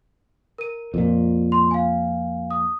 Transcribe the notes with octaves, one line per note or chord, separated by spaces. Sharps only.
A#4 D#7
F2 A#2
C6
F5 G#5
D#6